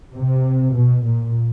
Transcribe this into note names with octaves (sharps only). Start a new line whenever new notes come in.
C3
B2
A#2